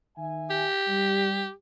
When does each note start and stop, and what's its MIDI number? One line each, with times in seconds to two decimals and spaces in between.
0.17 0.65 51
0.17 0.65 76
0.17 0.65 80
0.51 1.51 67
0.88 1.45 55